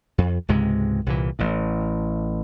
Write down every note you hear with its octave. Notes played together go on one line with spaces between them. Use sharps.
F2
C#2 G#2 C3 G#3
C2 A#2 E3
A1 A2